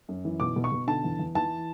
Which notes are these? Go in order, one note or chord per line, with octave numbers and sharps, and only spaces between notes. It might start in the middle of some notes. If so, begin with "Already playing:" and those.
F#2
E3
B2 D6
B2
C#6
B2
D3 A5
E2
E2
E3 A5